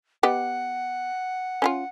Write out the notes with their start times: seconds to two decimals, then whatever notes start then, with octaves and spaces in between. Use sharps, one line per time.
0.23 B3 G4 D#5 F#5
1.62 C#4 E4 F4